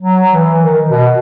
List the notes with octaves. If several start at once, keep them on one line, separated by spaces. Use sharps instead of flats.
F#3
E3
D#3
B2